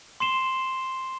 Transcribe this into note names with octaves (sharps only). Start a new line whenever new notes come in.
C6 C7 E7 G7